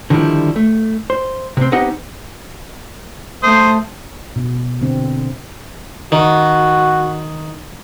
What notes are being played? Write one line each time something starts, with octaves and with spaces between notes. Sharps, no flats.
D3 D#3 F3 G3 E4
A3
C5
C3 C4
B3 C4 D#4 G4 D#5 F#5
A3 C5 D#6
B2
D3 C4
D#3 F#4